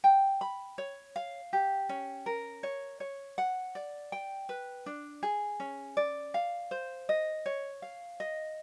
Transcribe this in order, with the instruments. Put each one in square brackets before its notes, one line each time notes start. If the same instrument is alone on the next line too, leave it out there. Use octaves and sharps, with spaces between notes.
[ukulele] G5
B5
C#5
F5
G4
C#4
A#4
C#5
C#5
F#5
D5
G5
B4
D4
G#4
C#4
D5
F5
C5
D#5
C#5
F5
D#5